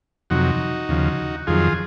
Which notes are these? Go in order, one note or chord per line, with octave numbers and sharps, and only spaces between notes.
F2 C3 F#3 D#4 F#4
D#2 C#3 F3
F2 D#3 F#3 F4 G#4